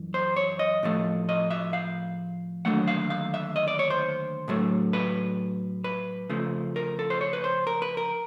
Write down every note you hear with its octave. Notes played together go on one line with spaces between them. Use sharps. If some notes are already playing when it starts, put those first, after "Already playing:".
Already playing: F#2 E3
C5
C#5
D#5
A2 F3 A3
D#5
E5
F5
D#2 D3 F#3 A3 F#5
F5
F5
E5
D#5
D5
C#5
C5
A2 F#3 A3
B4
B4
F2 C#3 F3 A3
A#4
A4
C5
C#5
B4
C5
A#4
B4
A#4